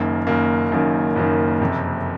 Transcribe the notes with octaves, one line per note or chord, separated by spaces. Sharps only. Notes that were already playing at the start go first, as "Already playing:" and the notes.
Already playing: F#1 F#2 D#3 A#3
F#1 F#2 D#3 A#3
F#1 F#2 D#3 A#3
F#1 F#2 D#3 A#3
F#1 F2 C3